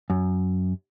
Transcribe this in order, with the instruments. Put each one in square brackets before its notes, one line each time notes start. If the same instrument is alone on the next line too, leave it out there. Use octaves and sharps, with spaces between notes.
[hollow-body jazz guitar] F#2